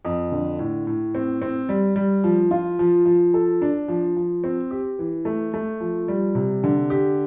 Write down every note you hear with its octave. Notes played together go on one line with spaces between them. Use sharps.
F2
D3
A2
A2
C4
C4
G3
G3
F3
F4
F3
F3
A4
D4
F3
F3
C4
G4
E3
A3
A3
F3
G3
C3
D3
G4